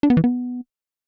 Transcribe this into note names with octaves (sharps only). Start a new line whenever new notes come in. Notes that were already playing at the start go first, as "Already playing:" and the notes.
D4
B3
E3
B3